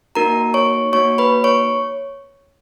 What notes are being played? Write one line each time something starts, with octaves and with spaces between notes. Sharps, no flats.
A#3 D#4 F#4 A#4 A#5
C#5 C#6
A#3 D#4 F#4 C#5 C#6
B4 B5
C#5 C#6